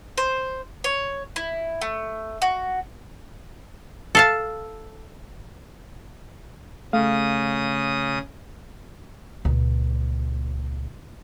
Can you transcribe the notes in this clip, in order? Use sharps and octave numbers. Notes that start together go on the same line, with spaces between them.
C5
C#5
E4
A3
F#4
A4 F5 A5
C#3 A3 F5 D#6
C#2 A#2